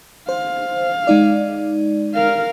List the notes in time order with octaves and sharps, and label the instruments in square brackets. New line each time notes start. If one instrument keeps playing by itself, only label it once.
[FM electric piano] C5 [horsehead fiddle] F5
[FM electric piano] G#3 D#4 D5
[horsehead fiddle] A#4 F5